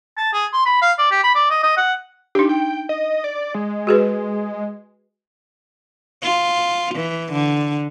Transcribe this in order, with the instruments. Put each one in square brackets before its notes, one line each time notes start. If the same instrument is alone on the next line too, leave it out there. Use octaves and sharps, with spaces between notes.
[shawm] A5
G#4
C6
B5
F5
D5
G4
B5
D5
D#5
D#5
F#5
[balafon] D4 D#4 [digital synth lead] G4
[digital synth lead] G5
D#5
D5
G#3
[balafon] F#4 G#4 B4
[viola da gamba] F4
E3
D3